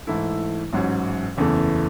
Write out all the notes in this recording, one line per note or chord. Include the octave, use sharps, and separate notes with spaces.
G#2 E3 A3 E4
A1 G#2 F#3 C#4
F#1 E2 C#3 E3 A3